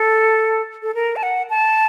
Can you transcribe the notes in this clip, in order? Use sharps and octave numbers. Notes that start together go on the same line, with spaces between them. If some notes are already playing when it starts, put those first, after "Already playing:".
Already playing: A4
A4
A#4
A5
F#5
A5